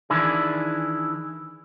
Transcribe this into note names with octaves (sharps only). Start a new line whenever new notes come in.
D#3 E3 D4 E4 G#4